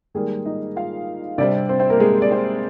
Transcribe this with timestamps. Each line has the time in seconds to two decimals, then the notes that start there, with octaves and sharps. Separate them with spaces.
0.14 D#3 G3 G#3 A#3 G#4
0.46 D#4 D#5
0.76 F4 F5
1.38 C3 G3 C4 D4 D5
1.69 C4 C5
1.79 C4 C5
1.90 A#3 A#4
2.00 G#3 G#4
2.22 D5
2.31 C4 C5